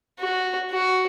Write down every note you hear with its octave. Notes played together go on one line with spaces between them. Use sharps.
F#4
F#4